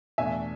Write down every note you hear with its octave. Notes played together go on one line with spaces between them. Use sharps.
E2 B2 A3 D4 E5 G#5